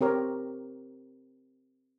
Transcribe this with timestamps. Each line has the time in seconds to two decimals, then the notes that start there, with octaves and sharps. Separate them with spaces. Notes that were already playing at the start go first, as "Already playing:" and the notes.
0.01 C4 G4 A#4 C#5